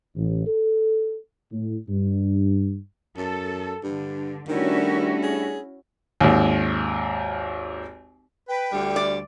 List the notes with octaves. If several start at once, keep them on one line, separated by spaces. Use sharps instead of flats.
A1
A4
A2
G2
F#2 A4
G2 D3
D#3 G3 A3 C#4 D4 E4 F#4
G#4
G#1 D#2
B4 G5
D2 D3 G3
D5